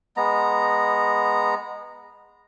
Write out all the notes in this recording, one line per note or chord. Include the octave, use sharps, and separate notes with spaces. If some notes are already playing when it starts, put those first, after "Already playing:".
G#3 B3 A#5